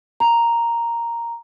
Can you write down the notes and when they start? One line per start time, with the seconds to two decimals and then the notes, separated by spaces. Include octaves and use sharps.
0.20 A#5